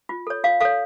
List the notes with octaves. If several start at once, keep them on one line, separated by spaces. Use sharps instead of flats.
F4
A4 C#5
F4 F5
A4 C#5 F5